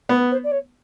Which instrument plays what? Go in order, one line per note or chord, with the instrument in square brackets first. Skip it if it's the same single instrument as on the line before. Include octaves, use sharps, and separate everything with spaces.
[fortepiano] B3 [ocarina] B4
[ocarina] C5
D5
C#5